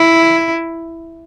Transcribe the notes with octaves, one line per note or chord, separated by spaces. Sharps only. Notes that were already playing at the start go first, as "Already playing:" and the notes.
Already playing: E4